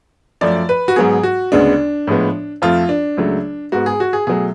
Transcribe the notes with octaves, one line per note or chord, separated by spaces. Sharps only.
F#2 F3 A3 D5
B4
F#4
G#2 F#3 B3 G#4
F#4
D2 C#3 G#3 B3 D4
A2 F3 G#3 B3
F2 F3 A3 F4
D4
C#2 C#3 F#3 A3
G#2 G#3 B3 F#4
G#4
F#4
G#4
B2 F#3 A3 G#4